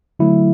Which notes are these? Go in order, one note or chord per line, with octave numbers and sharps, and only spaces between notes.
D3 F#3 A3 E4